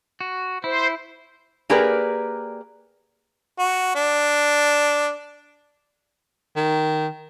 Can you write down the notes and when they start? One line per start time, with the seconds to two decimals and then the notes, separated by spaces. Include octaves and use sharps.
0.21 F#4
0.64 E4 C5
1.70 A#3 G4 G#4 A#4 B4 D5
3.59 F#4
3.95 D4
6.56 D#3